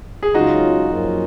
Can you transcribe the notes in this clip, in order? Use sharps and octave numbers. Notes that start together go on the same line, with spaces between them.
G#4
C#2 C#3 F#3 C#4 D#4 F4 F#4
F#2 F3 A#3 C#4 F4